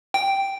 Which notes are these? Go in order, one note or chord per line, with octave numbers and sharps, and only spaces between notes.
G5